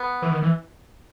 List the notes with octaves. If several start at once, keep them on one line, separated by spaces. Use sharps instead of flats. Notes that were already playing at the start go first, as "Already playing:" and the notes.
Already playing: B3
E3
D#3
E3